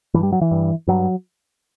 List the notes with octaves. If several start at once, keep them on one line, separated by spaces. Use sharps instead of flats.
G2 E3
G3
F#3
E3
G2
G2 F#3